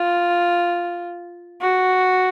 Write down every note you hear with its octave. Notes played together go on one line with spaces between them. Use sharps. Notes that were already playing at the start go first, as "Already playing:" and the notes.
Already playing: F4
F#4